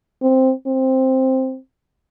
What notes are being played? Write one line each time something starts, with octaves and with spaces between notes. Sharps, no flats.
C4
C4